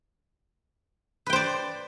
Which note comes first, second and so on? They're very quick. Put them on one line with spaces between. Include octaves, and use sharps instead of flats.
B4 G5 C5 D5